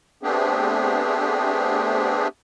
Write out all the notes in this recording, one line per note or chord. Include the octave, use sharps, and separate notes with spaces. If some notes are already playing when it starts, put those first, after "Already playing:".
A3 B3 C4 D4 G4 G#4